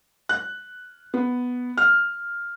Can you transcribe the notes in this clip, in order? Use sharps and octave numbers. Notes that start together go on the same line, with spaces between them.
F#6
B3
F6